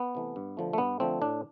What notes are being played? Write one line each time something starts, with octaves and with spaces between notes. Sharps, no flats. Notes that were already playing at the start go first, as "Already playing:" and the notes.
Already playing: B3
C3 E3 A3
G2
D3 F3 A3
A3
G2 B3
D3 F3 A3 C4
A2 D4